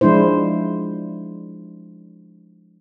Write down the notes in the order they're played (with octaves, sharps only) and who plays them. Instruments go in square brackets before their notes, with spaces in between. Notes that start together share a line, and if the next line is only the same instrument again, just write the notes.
[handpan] F3 G#3 D4 E4 C5